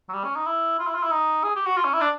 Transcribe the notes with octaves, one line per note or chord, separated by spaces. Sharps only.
F#3
G3
C#4
D#4
E4
F4
E4
F4
E4
D#4
G#4
G4
F#4
F4
C#4
E4
D4